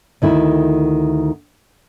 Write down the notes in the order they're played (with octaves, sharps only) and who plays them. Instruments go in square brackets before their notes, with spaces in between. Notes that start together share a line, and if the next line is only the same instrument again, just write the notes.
[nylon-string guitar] D2 D#3 E4